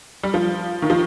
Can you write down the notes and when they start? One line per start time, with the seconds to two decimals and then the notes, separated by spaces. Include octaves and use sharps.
0.23 G3
0.34 F3
0.82 D#3
0.90 F3